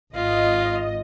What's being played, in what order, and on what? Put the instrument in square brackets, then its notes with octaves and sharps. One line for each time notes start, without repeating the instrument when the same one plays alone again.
[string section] G#1 D#5 [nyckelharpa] F4